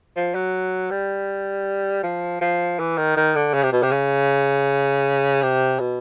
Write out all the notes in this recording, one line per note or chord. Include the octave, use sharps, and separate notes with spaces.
F3
F#3
G3
F3
F3
E3
D#3
D#3
D3
C#3
C3
B2
C3
C#3
C3
B2